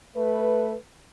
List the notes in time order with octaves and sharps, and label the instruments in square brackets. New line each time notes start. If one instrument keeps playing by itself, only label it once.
[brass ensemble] A3 B4